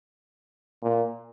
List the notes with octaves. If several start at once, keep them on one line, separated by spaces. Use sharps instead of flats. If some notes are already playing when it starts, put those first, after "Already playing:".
A#2